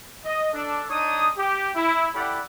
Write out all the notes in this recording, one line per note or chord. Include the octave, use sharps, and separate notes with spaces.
D#5
D4 A4
D4 D#4 C#5 D#6
G4
E4
E4 G4 A4 D5 F#5 B5